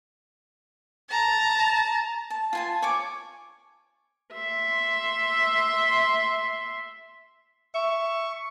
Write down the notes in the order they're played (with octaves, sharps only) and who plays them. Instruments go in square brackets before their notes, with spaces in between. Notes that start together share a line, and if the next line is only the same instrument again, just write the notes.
[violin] A5 A#5
[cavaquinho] A5
F4 G#5 A5
C#5 G#5 D6
[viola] E5 C6
[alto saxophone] E5 [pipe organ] C#6